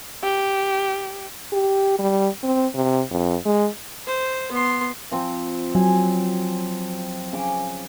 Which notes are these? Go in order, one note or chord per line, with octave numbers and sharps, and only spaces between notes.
G4
G4
G3
C4
C3
F2
G#3
C5
B3 C6
F3 C4
F#3 G#5
C#3 D6